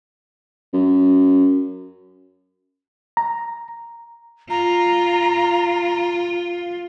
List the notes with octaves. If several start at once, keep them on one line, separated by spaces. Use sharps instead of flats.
F#2
A#5
F4 A#5